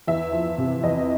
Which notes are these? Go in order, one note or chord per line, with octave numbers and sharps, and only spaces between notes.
E2 E5
F3
C3
E2 D#5